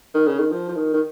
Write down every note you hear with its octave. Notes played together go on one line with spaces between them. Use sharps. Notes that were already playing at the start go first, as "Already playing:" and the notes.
D#3
C#3
D#3
F3
F3
D#3
D#3